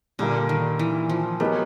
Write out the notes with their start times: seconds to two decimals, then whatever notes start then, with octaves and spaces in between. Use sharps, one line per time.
0.19 A#2 D3 G3 A#3
0.49 D#3
0.79 E3
1.09 F3
1.40 F#3 G#3 B3 D#4 G4 A#4